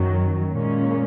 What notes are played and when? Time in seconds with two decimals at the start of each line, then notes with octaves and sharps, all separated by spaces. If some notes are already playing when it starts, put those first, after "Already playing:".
Already playing: F#2 D#3 F#3
0.53 A#2 G#3 C#4